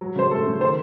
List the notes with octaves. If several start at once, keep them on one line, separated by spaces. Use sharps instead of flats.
F#3
C#3 C5
A3 A4
C#3
D#3 C5